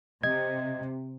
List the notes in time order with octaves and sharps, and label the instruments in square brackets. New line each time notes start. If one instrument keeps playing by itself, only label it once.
[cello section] C3 [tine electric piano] D#5 G#6